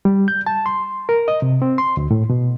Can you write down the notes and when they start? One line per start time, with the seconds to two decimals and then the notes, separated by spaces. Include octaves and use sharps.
0.05 G3
0.28 G6
0.47 A5
0.66 C6
1.09 A#4
1.28 D#5
1.42 C3
1.62 C4
1.78 C6
1.97 D2
2.11 A2
2.30 B2